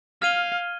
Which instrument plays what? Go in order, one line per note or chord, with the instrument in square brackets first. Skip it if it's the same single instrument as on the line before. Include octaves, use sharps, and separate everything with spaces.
[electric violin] F5 [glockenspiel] F6 G#6 D#7 G7